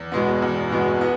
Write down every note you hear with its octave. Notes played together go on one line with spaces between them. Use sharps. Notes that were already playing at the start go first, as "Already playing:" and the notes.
Already playing: E2
B2 G#3 B3
E2
B2 G#3 B3
B3